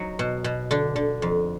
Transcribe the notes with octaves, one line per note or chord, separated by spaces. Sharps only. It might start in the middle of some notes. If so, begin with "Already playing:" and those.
Already playing: F#3 D#4
B2
B2
D3 D4
D3
F2